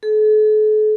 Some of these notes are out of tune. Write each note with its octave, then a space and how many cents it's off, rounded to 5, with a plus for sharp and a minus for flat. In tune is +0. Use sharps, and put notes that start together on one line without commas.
A4 -45